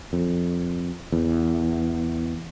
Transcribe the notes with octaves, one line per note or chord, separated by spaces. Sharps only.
F2
E2